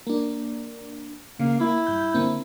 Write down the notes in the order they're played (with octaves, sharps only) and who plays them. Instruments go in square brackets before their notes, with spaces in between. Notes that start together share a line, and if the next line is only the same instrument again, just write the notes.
[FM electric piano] A#3 D4
[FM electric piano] C#3 [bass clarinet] A#3
[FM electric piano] A#3 [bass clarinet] E4
[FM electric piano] G2 G6
D3 A#3 C4